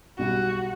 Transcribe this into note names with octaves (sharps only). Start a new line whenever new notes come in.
B1 B2 G3 F#4